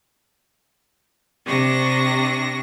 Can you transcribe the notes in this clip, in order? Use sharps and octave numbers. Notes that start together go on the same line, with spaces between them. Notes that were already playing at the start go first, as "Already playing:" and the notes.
C3 D4 C#6 A#6